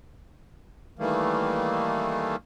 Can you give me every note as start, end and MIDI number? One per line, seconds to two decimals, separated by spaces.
0.99 2.36 51
0.99 2.36 52
0.99 2.36 55
0.99 2.36 57
0.99 2.36 58